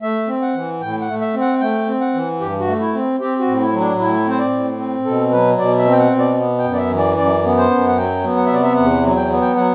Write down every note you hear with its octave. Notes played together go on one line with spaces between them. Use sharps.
A3 E5
C4
F#5
E3
A2 G5
F#5
A3
E5
C4
F#5
A3 G5
C4
F#5
E3
G2 G4
F#4
A3
E4
C4
C4 G4
F#4
A2
E4
F#3
D4
A2 E4
C4 C5
D5
A2
C4
B2 A4
F#3 B4
B2 D5
E5
C4
G5
F#5
B2
D5
B3
G5
F#2
D5
E5
E3
D5
F#2 D5
B3
C5
F#2
F#5
F#3 G5
B3
F#5
E5
C3 D5
E5
E2 F#5
F#3
G5
B3
G5
F#3 F#5